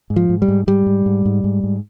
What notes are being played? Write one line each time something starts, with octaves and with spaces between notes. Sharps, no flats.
G#2
F3
G#2
G3
G#2
G#2 G3
G#2
G#2
G#2
G#2
G#2